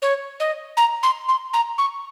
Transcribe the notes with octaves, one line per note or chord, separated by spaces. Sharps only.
C#5
D#5
A#5
C6
C6
A#5
C#6